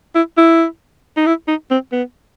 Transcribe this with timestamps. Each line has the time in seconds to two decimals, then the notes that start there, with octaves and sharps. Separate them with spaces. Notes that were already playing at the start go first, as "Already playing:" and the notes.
0.15 E4
0.38 E4
1.17 D#4
1.26 E4
1.48 D#4
1.71 C4
1.92 B3